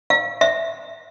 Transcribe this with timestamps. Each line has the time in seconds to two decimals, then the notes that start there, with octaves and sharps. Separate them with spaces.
0.10 F5
0.41 E5